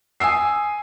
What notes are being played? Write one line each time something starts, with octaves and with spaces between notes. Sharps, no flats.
G#5 D#6 E6 C7